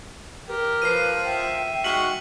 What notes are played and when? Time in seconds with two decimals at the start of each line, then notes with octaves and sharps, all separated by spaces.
0.48 G4 A#4
0.82 F3 B4 C7 D#7
1.24 E5 G5
1.84 G#3 D#4 F#4 F6 B6 F#7